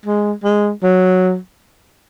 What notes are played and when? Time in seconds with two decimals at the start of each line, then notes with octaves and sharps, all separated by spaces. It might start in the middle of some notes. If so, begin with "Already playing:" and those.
0.06 G#3
0.44 G#3
0.83 F#3